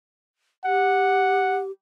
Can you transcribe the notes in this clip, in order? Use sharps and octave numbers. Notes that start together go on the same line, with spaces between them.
G4 F#5